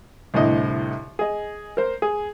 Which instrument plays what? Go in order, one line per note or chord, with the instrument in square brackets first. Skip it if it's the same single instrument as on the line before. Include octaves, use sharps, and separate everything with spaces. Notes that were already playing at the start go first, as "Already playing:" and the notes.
[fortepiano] C2 A2 D3 D#5
G#4 D#5
A#4 C5
G#4